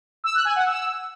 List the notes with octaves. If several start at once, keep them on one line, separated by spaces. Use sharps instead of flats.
E6
F#6
G#5
F#5
E6